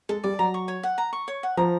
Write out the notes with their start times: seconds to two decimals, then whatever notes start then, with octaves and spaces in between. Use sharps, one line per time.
0.09 G#3 A4
0.24 G3 D5
0.39 F#3 A#5
0.54 C#6
0.68 C#5
0.83 F#5
0.98 A#5
1.13 C#6
1.28 C#5
1.43 F#5
1.57 F3 A#5